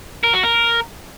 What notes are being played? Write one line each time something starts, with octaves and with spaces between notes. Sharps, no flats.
A#4
F#4
A#4